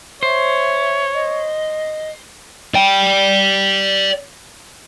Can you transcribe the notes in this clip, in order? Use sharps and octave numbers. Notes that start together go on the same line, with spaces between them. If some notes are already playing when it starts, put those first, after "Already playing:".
C5 C#5 E5
D#5
D5 G5